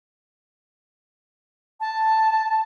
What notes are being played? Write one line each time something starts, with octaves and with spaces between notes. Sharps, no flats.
A5